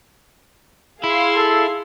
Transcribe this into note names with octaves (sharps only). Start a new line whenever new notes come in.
E4 G#4 F5 C6
A4